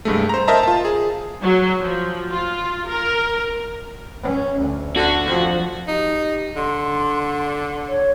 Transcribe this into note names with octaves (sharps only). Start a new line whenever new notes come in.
C2 G2 G#3 A3
C5 A#5
A#4 C5 D#5 E5 A5 A#5
F4 A5
G#4
F#3
F3
F4
A#4
C#4
D2
D3 F#4
F2 F3
D#4 G4
D3 C6
C#5